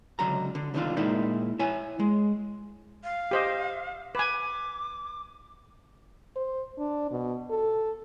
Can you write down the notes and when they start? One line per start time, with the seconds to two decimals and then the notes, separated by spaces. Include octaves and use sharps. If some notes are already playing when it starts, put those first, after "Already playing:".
0.19 C#2 D3 F#3 A#5
0.55 D3
0.74 C2 D3 D#3 C#4 D4 F4
0.97 A#2 G#3 D#4 E4 A#4
1.59 E4 C#5 G#5
2.00 G#3
3.04 F5
3.31 G4 C5 D#5
4.15 B4 G#5 D6
6.36 C5
6.78 D4
7.11 B2
7.50 A4